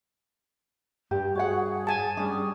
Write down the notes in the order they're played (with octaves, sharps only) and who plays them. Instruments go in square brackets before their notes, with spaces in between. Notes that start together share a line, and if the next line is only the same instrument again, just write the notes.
[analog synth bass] G2 [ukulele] G4
[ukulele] F#4 C#5 F#5 [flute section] G#4
[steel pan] G#5 A5
[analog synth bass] G3 [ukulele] C#4 D4 [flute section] G#4 D#6